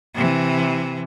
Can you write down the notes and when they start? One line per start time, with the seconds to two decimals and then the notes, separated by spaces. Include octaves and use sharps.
0.15 C3 E3